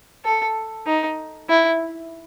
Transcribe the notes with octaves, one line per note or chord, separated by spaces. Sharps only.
A4
D#4
E4